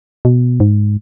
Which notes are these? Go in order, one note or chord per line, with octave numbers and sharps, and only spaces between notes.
B2
G#2